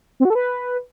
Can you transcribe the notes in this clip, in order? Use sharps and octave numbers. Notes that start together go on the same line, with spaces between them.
C4
F#4
A4
B4